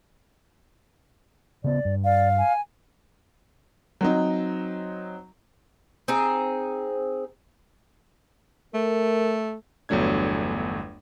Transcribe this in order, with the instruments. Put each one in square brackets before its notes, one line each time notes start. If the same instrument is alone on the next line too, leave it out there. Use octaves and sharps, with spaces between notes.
[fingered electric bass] C#3 B3 [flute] D5
[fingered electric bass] G2
[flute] D5 [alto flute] F5
[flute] G#5
[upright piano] F#3 C4 D#4
[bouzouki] C4 D#4 G#4
[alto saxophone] A3 [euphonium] A#4
[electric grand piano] G1 E2 F#3 A3 D4 G#6